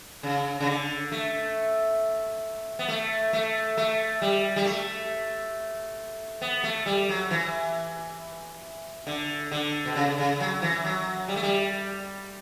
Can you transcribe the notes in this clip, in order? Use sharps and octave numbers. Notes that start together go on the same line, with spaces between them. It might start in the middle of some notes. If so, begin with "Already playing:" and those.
C#3
C#3
D3
A3
B3
A3
A3
A3
G3
G3
A3
B3
A3
G3
F#3
E3
D3
D3
B2
C#3
C#3
F#3
E3
F#3
G3
A3
G3